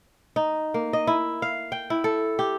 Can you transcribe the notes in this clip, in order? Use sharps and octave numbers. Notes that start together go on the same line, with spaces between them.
D#4
A#3
D#5
E4
F5
G5
E4
A4
G4